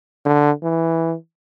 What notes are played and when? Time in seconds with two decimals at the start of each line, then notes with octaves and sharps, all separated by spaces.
0.25 D3
0.63 E3